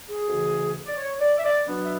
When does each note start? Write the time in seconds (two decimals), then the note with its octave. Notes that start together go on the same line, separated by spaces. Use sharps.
0.09 G#4
0.27 D2 C#3 E3
0.87 D5
0.97 C#5
1.21 D5
1.38 E5
1.45 D5
1.68 B2 F#3 B3 D4
1.84 E5